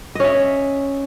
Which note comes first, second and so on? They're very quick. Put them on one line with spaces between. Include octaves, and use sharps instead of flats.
D#5 C#4 E5